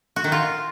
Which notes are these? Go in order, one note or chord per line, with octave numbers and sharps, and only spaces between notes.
F#4
D#3
F4